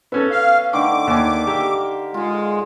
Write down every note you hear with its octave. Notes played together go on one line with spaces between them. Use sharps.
B3 C#4 A4 E5
F5
D3 D#3 A3 D6
D#2 G#5
G4 A#4 E5 F5
G#3 F4 F5